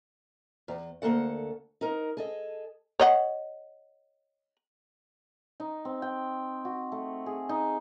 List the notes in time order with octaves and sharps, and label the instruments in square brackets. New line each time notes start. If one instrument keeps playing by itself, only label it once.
[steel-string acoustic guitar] E2
D2 F3 A#3 A4 F#5
D#4 A#4
G#4 A4 D#5
[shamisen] C#5 D#5 F#5
[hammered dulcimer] D#4
C4
G5
F#4
A3
G#4
D#4